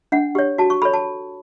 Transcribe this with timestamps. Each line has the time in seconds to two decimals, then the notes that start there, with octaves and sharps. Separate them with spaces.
0.12 D4 F#5
0.35 G4 C#5
0.58 F#4 A5
0.70 C#6
0.82 A4 C#5 B5
0.93 A5